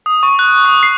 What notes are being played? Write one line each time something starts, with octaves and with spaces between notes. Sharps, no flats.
D#6
C#6
F#6
D#6
C7